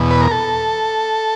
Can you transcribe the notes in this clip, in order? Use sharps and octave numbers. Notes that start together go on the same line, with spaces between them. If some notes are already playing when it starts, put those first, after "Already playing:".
Already playing: E2 B2
B4
A#4
A4